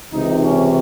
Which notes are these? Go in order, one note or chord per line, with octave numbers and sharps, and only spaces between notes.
C#2 C3 E3 D#4
C#4